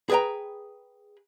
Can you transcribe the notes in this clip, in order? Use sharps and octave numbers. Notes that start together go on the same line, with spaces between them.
G#4 B4 D5 G5 A#5